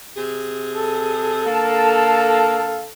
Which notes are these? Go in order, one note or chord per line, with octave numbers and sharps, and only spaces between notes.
C3 G#4
A4
D3 A#3 F5 A5